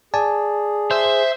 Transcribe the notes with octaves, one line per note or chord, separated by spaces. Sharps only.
G#4 D5 G#5 A5
C5 E5